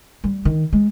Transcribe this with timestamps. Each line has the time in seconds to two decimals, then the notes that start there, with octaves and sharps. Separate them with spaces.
0.24 G3
0.45 D#3
0.73 G#3